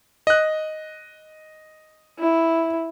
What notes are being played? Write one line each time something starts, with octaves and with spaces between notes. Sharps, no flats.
D#5 F#6
E4